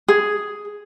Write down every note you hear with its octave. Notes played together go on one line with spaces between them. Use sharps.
G#4